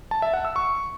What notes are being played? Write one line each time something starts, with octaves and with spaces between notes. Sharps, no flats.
A5
E5
F#5
E6
C#6